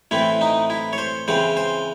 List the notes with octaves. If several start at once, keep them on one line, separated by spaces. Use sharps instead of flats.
A2 E3 C4 E4
D#4
E4
C#5
C5
C#3 E3 C4 C5
C5